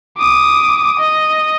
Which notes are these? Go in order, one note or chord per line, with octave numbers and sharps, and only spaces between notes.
D6 D#6
D#5